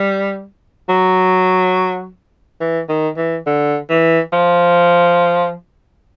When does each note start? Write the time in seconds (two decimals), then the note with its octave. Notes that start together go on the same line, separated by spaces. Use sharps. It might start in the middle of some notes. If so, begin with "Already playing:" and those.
Already playing: G3
0.89 F#3
2.60 E3
2.89 D#3
3.17 E3
3.46 D3
3.90 E3
4.33 F3